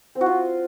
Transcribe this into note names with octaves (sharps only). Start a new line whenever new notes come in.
C4
F#4
F4